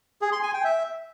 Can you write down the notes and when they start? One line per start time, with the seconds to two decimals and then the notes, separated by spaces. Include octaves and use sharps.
0.22 G#4
0.32 C6
0.43 G#5
0.54 G5
0.64 E5